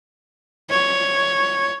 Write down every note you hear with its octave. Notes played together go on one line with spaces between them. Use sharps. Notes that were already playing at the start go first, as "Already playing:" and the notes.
C#5